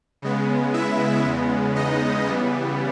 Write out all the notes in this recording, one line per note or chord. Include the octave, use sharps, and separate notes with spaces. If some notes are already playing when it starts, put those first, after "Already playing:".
C#3 G#3 B3
E4 E5
E2 C#3 G#3 B3
D#4 D#5
C#3 E3 G3 B3